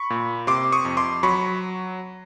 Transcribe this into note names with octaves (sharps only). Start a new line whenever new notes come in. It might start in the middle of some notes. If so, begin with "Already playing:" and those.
Already playing: B5 C#6
A#2
C3 C6 D6
C#6 D#6
F2
C6 D6
F#3 B5 C#6